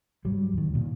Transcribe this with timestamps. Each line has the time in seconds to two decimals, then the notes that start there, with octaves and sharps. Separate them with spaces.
0.25 G#2 F#3 G3
0.53 D#2 D#3
0.74 A#2 D#3